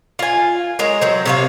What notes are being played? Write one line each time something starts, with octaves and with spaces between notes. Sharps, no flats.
F4 G#5
G#3 A#4 C#5
F#3 C4
C3 C#5 F5